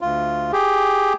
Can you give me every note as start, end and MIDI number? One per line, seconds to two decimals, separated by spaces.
0.01 0.52 38
0.01 0.52 65
0.52 1.13 67
0.52 1.13 68